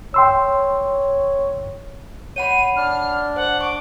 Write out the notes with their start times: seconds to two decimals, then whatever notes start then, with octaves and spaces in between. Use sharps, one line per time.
0.14 C#5 G5 C6 E6
2.36 C#5 F#5 B5 D#7
2.76 D4 F6
3.36 C5 F#5
3.61 C#6 D6